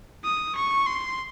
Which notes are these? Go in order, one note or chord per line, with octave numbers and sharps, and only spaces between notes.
D#6
C#6
C6